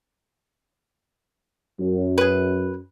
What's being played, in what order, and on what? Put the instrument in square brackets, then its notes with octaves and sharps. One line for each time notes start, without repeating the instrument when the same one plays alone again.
[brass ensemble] F#2
[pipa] G#4 B4